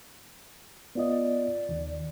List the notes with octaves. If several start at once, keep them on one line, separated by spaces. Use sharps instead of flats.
B3 F4 D5 D#5
D#2 D#3